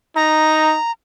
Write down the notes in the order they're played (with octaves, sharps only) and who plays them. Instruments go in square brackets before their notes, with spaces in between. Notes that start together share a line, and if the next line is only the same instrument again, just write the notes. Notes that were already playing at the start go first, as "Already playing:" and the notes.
[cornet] D#4 [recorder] A#5